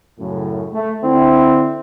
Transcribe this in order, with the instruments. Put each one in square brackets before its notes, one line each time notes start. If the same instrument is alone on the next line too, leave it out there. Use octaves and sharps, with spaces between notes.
[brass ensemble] F#2 A2 C#3
A3
D3 C4 E4